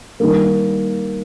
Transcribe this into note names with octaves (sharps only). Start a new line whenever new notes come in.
D#3 G3 A#3